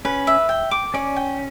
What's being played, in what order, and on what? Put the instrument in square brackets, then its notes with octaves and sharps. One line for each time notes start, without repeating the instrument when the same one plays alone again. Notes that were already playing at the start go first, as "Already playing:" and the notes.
[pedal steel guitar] C#4 [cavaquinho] B4
[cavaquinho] E5
G5
D6
[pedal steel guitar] C#4 [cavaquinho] D5
[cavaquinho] G5